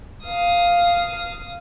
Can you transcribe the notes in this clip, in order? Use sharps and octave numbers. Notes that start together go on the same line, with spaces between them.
F5 D#6